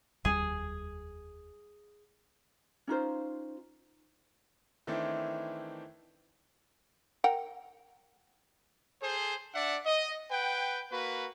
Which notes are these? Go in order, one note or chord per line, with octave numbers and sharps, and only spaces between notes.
F1 D#2 G3 G#4
C#4 D#4 F4 C5
D#3 E3 A3 C4 D4 E4
A#4 F#5 G5
G#4 A4 C5
D4 D5 E5 F#5
D#5
B4 F#5 G5
A#3 F#4 B4